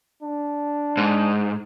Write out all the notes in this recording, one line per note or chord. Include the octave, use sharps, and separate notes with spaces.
D4
G#2